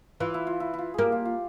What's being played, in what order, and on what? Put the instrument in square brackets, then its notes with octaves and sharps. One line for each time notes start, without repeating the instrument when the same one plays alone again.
[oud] E3 [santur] F4
[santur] E4
F4
E4
E4 F4
[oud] A#3 [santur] G4 G#4
[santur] F4
F4